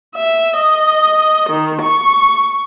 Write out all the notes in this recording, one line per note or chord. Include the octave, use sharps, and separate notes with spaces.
E5
D#5
D#3
C#6